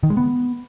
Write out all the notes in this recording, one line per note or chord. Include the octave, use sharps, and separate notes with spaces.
D#3
G#3
B3